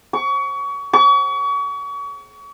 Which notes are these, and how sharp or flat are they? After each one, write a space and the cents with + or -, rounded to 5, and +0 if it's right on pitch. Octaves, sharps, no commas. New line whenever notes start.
C#6 +30
C#6 +35